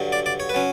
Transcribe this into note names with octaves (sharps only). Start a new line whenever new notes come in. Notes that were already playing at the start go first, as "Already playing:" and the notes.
Already playing: G2 D3 F#3
D5
D5
C#5
B4
F#3 C#4